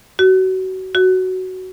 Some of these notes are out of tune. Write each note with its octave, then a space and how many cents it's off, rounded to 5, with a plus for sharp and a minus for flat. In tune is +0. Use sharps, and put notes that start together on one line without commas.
F#4 +25
F#4 +10